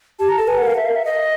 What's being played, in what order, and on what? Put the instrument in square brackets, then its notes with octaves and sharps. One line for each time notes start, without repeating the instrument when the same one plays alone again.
[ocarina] G4 [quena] A5
[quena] A#5
[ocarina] A4 [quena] A5
[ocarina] B4 [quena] G#5
[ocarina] A#4 [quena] F#5
[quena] F5
E5
F5
E5
D#5